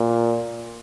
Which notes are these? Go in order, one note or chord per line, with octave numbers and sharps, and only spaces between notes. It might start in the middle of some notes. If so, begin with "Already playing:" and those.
Already playing: A#2